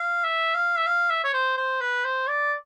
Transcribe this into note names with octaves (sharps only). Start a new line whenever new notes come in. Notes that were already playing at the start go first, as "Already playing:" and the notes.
Already playing: F5
E5
F5
E5
F5
E5
C#5
C5
C5
B4
C5
D5